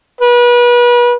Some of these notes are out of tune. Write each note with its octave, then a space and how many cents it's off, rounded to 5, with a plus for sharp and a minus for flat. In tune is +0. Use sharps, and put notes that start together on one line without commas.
B4 -35